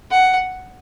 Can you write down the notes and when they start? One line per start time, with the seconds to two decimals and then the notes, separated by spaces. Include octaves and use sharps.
0.11 F#5